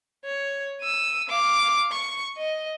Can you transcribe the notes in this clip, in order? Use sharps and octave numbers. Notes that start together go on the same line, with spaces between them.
C#5
E6 D#7
F5 D6
C#6
D#5